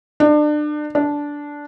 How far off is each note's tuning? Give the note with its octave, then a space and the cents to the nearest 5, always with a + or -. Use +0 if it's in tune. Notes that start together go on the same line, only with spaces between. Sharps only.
D4 +30
D4 -10